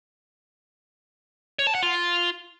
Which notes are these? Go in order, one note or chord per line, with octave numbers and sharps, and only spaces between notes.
C#5
A5
F#5
F4